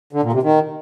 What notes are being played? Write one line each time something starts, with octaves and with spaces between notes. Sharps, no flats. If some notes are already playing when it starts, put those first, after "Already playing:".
D3
A#2
C3
D#3